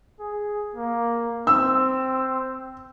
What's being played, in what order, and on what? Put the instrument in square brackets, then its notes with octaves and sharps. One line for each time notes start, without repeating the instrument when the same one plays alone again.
[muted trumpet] G#4
A#3
[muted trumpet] C4 [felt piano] E6